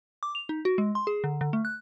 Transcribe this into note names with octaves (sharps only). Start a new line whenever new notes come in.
D6
F7
D#4
F#4
G#3
C6
G#4
D3
D3
A3
F#6